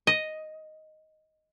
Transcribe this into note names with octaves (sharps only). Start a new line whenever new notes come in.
D#5